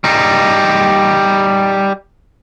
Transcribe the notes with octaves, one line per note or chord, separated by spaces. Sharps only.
G3 D#4